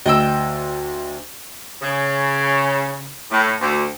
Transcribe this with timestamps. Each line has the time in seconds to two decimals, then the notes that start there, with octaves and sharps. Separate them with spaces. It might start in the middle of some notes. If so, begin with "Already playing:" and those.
0.06 D2 D#5 G5 E6
1.82 C#3
3.31 A2
3.61 D2